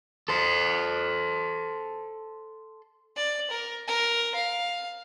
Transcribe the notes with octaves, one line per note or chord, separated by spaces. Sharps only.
A4 C5
D5
A#4
A#4
F5